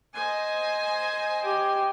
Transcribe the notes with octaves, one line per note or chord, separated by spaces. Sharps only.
C5 D#5 G#5
G4